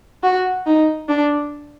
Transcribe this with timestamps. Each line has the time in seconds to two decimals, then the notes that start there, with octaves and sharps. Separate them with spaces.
0.23 F#4
0.66 D#4
1.08 D4